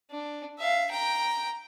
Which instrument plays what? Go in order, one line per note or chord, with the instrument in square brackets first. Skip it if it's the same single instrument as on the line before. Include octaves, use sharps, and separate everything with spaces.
[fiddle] D4
E5 F5
G5 A#5